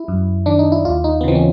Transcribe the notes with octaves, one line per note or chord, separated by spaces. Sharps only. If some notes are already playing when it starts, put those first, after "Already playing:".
Already playing: E4
F#2
D#3 D4
D#4
E4
D#2 F4
D#4
B3
C#3 E3 C4
C#4